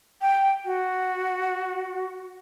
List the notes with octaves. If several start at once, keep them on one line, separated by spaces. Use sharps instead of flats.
G5
F#4